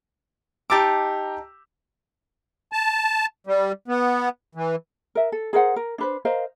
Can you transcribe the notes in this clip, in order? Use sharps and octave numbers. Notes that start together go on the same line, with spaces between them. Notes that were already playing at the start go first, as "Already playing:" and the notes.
D#4 G4 A5 A#5 D6 E6
A5
G3
B3
E3
A#4 E5
A4
G#4 A#4 C5 F#5
A#4
D4 B4 C5
A#4 C5 D#5 F5